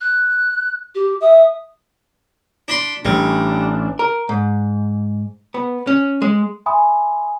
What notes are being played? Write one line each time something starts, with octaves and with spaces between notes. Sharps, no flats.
F#6
G4
E5 D#6
D4 B5 C6
A1 G3 D4
A#4
G#2
B3
C#4
G#3
E5 G#5 B5 C6 D#6